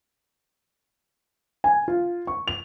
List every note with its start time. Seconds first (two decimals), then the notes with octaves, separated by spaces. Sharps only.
1.64 G#5
1.88 F4
2.27 C#6
2.48 F7